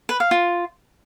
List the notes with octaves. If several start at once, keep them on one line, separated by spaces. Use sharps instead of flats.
B4
F5
F4